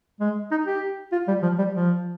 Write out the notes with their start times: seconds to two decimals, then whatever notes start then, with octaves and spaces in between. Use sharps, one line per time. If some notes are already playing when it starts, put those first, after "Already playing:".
0.20 G#3
0.51 D#4
0.66 G4
1.12 F4
1.28 G3
1.42 F3
1.58 G3
1.73 F3